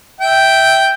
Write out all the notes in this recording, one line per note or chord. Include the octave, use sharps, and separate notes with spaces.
E5 G5